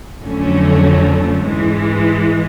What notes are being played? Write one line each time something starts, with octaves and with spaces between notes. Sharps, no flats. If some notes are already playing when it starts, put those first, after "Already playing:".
F2 D3 F#3 A3 C#4
G#2 E3 G#3